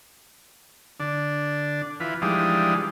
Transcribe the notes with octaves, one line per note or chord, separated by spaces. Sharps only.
D3 D4
E3 F4 B4
E3 F3 G3 G#3 D4 D#4